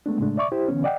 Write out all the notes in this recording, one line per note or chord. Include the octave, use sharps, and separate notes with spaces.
G#3 A3 B3 D4
A2 C#3 G#3 A3 D4
D5 E5 C#6 D6
E4 G4 C5
D3 E3 B3 C#4
D5 D#5 F#5 G5